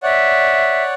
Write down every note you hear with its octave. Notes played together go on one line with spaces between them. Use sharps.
C#5 D5 E5 F#5